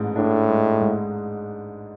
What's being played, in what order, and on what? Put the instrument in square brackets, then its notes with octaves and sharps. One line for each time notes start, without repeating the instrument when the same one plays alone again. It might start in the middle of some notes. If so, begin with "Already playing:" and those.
Already playing: [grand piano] A1 G#2 G#3
[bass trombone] A2 [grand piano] D4
[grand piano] G#3
G#2